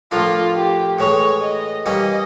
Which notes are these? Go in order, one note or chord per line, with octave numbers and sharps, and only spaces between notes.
A2 F3 A#3 D4 F4
G4
A2 E3 G#3 C#5
D#5
E3 G3 A#3 C#4 D#5